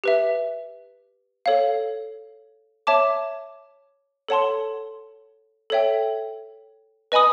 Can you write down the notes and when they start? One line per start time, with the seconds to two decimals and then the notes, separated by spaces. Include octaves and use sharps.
0.04 G4 B4 E5
1.46 A4 C#5 F5
2.87 C#5 E5 A5 D6
4.28 A4 C#5 F#5 A5 C6
5.70 A4 C#5 E5 G5
7.12 B4 D#5 G#5 B5 D#6